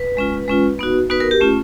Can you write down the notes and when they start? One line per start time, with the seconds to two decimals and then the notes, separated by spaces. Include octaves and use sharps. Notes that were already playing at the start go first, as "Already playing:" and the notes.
Already playing: B4
0.17 G#3 C#4 F4
0.48 G#3 C#4 F4
0.79 B3 D#4 F#4
1.10 B3 D#4 F#4 B4
1.20 A#4
1.31 G4
1.40 A3 C#4 F4